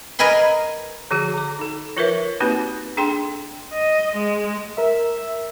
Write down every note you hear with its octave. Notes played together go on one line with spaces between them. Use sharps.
A#4 B4 D#5 G#5 B5 C6
D3 F3 F#4 G#4
D3 D6
D#4 A4
F3 F4 A#4 B4 C#5 E5
A#3 C4 D#4 F#4 G4 B4
D4 G#4 A4 G5 C6
D#5
G#3
A#4 E5